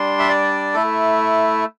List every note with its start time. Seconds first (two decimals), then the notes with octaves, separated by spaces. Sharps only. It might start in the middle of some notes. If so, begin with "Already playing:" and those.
Already playing: G3 D4 C6
0.19 E5
0.29 D5
0.74 A3 E4 A4